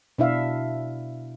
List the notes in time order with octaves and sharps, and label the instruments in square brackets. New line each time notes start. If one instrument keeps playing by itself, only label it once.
[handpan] B2 D4 E4 E5 F5